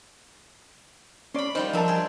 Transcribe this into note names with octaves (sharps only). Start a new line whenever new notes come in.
C#4 D5 B5 C6
D#3 G3 F4 C5
F3 D4 A#4 E5 A5
G3 G#4